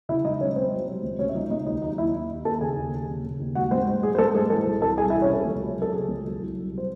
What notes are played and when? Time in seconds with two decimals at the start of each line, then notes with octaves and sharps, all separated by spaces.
0.09 C#3 E4 E5
0.24 G#3 D#4 D#5
0.40 G#3 C#4 C#5
0.56 G#3 C4 C5
0.72 F#3
0.88 C3
1.03 C#2
1.19 C#2 C#4 C#5
1.29 E5
1.34 C#2 D#4 D#5
1.50 C#2 D#4 D#5
1.66 D#2 D#4 D#5
1.82 F#3 D#4 D#5
1.98 D#2 E4 E5
2.14 D#2
2.30 D#2
2.45 D#2 A4 A5
2.61 C#3 G#4 G#5
2.77 D#2
2.93 D#2
3.09 C#3
3.24 C#3
3.40 D#2
3.55 G#3 F#4 F#5
3.71 G#2 C4 C5
3.88 G#3
4.03 G#3 G#4
4.15 C5
4.18 G#2 A4
4.35 G#2 G#4
4.50 E3 A4
4.67 C2
4.82 C2 A4 A5
4.97 C3 G#4 G#5
5.10 E4 E5
5.14 E3
5.22 C#4 C#5
5.29 C3 A4
5.45 C#2
5.61 F#3
5.76 F#3
5.82 A4
5.92 C#3 G#4
6.08 C#2
6.24 F#3
6.39 C2
6.55 F#3
6.71 C3
6.78 C5